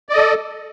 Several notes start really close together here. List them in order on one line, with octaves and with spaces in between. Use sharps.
D5 D#5 A4